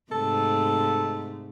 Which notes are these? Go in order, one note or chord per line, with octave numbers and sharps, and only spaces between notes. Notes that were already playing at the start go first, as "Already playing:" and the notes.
G#2 C3 A3 A4